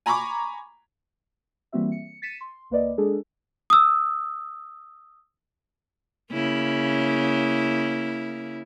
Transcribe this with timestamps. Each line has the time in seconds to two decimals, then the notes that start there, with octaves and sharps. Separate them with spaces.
0.06 G#5 A#5 B5 C#6 D6
1.72 E3 G3 A#3 C4 F#4 E5
1.92 C#7
2.22 A6 B6 C#7 D#7 E7
2.41 C6
2.70 C#2 A#3 B4 D5 D#5
2.98 G#3 D4 G#4 A4
3.70 D#6 E6
6.32 C#3 A#3 E4